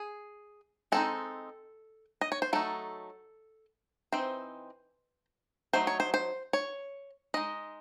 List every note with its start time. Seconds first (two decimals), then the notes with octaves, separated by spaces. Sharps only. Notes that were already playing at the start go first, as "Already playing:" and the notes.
Already playing: G#4
0.92 G#3 C4 D#4 A4
2.21 D#5
2.32 C#5
2.42 C5
2.53 F#3 A3 D#4 A4
4.12 E3 C4 D#4 C5
5.73 F#3 A3 D#4 C5
5.87 C#5
6.00 C5
6.14 C5
6.53 C#5
7.34 G#3 D#4 D#5